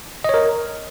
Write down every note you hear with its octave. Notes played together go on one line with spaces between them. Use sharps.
A#4 C#5 D#5